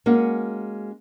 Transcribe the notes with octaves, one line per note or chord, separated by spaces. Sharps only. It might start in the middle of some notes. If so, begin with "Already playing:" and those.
G#3 A#3 C#4 F#4